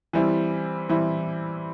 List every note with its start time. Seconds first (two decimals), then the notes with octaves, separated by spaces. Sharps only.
0.13 E3 G3 C4 E4
0.89 E3 G3 C4 E4